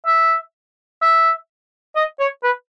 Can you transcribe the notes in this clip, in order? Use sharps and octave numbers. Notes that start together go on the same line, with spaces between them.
E5
E5
D#5
C#5
B4